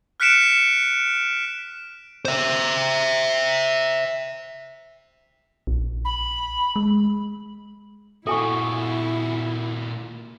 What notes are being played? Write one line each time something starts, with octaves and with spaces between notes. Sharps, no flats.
F6 F#6 B6 C#7 D7 E7
C5 E5
A#1
B5
G#3
A#2 E4 F#4 A4 G#5 C#6